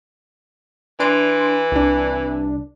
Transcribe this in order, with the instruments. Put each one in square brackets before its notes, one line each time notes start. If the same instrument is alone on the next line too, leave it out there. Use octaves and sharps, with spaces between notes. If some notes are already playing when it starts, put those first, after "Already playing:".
[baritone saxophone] E3 [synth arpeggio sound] D4 C6 D7
[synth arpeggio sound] C2 D4